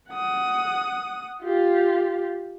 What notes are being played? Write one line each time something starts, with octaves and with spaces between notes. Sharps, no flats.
F#5 D#6
F4 G4